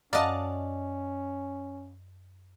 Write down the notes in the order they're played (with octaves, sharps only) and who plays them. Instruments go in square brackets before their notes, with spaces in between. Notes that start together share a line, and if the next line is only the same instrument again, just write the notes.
[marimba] F#2 [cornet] C#4 [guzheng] D5 D#5 [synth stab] F5 F#5 A5